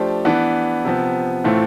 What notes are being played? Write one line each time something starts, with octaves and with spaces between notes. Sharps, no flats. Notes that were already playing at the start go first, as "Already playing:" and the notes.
Already playing: F3 A3 D4 G4 C5
E3 B3 D4
C3 F3 B3
A2 E3 A3 C4 F4